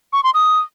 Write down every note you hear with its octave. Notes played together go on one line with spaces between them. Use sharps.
C#6
C6
D#6